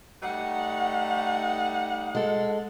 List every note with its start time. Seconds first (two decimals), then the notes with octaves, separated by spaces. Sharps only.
0.23 G3 A3 D#4 F#5
2.15 G#3 A4